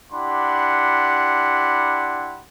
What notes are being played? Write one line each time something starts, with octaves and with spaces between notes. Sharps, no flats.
D4 E4 G4 F#5 B5 C6